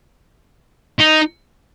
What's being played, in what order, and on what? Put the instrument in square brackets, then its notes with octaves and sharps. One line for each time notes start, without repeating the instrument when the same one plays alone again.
[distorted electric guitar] D#4